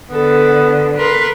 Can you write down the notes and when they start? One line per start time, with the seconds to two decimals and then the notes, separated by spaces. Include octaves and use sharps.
0.11 D3 B3 A4
0.97 A#4 B4 C6